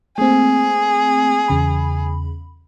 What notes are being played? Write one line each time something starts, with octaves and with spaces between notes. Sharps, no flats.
A3 A#3 C4 G#4
E2 C#3 B5